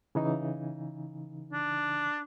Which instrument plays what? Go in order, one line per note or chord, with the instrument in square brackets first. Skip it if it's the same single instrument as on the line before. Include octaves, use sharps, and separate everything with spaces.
[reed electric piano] C#3 E3 D#4
[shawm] D4